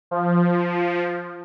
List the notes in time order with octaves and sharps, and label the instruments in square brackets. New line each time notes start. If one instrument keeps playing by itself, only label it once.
[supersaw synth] F3